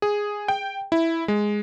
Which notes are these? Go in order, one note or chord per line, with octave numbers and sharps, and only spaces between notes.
G#4
G5
E4
G#3